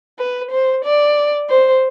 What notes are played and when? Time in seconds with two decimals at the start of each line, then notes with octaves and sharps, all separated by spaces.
0.19 B4
0.51 C5
0.85 D5
1.50 C5